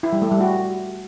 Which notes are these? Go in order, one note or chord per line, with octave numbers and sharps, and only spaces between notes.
E4
G3
A3
G3
F#4